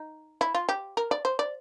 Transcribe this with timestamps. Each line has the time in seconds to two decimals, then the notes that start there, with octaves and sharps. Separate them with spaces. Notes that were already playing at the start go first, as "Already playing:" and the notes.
Already playing: D#4
0.41 E4
0.55 F4
0.69 G4
0.97 A#4
1.11 D5
1.25 C5
1.39 D5